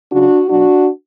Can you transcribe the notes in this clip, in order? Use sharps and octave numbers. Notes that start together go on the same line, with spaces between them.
C#3 F#3 D4 F#4
B2 F#3 D4 F#4